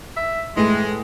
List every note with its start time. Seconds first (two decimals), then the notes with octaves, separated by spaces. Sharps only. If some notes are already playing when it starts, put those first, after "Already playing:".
0.17 E5
0.57 A2 E3 G#3